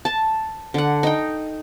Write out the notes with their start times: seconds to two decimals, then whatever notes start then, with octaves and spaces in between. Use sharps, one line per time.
0.05 A5
0.74 D3 F#5
1.03 D#4 G5